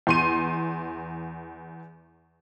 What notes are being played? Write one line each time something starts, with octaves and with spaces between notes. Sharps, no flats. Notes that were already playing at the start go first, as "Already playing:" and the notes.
E2 C6 D#7